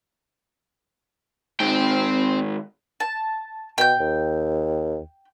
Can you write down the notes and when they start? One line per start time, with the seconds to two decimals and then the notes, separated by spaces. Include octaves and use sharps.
1.60 G#2 D#3 C4 G5
3.00 A5
3.78 B2 G5 G6
4.00 D#2